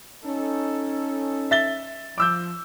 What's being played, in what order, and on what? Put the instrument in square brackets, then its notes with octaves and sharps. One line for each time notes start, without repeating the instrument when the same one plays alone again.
[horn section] C#4 D#4 A4
[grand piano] E5 A6 G7
[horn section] F3 [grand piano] D6 E6 G6